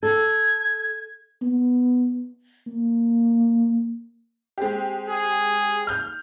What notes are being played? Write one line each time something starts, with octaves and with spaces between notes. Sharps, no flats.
A4 G#6
B3
A#3
G#3 C4 G4
G#4
F6 G6